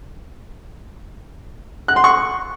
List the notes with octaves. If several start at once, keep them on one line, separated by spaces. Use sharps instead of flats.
F#6
C6
C#6